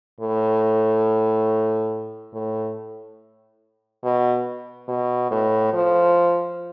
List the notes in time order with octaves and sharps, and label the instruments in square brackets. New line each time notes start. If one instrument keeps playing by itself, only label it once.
[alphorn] A2
A2
B2
B2
A2
F3